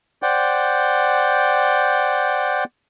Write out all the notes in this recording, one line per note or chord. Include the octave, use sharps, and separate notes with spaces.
C5 D5 F#5 G5